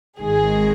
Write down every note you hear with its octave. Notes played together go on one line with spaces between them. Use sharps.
G#1 G#2 D#3 G#3 G#4